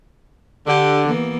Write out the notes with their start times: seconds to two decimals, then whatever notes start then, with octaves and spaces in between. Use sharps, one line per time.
0.67 D3 G4
1.04 E3 A#3 B3